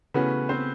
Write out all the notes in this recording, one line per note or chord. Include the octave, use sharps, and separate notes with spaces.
C#3 E3 A3 B3 C#4 F#4 B4
C4 C5